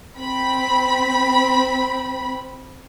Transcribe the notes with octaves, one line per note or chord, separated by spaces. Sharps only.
C4 B5